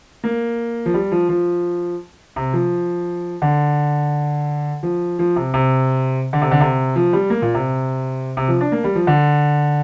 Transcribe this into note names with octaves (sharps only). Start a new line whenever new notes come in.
A#3
F3
G3
F3
F3
C3
F3
D3
F3
F3
C3
C3
D3
C3
D3
C3
F3
G3
A#3
A#2
C3
C3
F3
D4
A#3
G3
F3
D3